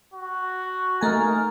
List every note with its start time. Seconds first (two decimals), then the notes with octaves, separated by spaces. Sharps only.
0.14 F#4
1.01 A3 A#3 D#4 A#4 G#5